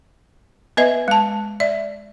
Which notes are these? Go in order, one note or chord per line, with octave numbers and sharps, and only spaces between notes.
B3 B4 D#5 E5
G#3 A5
D5 E5